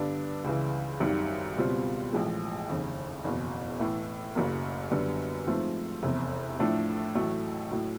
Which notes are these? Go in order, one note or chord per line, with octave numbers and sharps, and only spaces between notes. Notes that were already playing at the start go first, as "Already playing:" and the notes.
Already playing: G2 D3 G3 B3 D4
C#2 C#3 E3
G#1 F#2 D#3 G3
C#2 B2 G3 C4 F4
A1 A2 F3 G#3
F1 D#2 C#3
F#1 E2 B2
A2 E3 A3
F#1 F#2 C#3 F#3 A#3
F#2 D3 G3 B3
G#2 F3 A3 C4 F4
F1 E2 C3
A2 F3 A3 D4
A1 A2 F#3 A3
A2 F#3